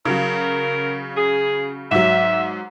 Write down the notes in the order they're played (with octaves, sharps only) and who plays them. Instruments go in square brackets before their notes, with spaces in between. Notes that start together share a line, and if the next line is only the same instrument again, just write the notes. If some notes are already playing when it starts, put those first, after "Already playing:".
[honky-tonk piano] C#3 F#3 [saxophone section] A#4
[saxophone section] G#4
[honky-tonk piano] G#2 F#3 [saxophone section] E5